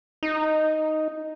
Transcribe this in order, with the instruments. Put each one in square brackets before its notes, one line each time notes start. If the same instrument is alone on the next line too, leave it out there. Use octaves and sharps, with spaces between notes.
[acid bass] D#4